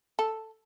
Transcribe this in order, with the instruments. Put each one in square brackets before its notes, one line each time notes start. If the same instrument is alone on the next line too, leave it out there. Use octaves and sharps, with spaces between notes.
[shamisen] A4